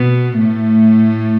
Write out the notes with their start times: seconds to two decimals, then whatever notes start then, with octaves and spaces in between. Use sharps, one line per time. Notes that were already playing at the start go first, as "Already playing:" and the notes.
Already playing: B2 B3
0.39 A2 A3